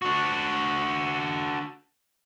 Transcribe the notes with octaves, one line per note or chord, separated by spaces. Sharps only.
D4 F#4